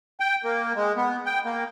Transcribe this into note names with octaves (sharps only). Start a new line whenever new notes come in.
G5
A#3
G#3
B3
G5
A#3